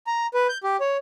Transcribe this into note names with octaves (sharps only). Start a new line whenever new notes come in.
A#5
B4
G6
G4
C#5